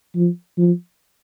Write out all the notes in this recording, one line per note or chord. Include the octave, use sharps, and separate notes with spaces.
F3
F3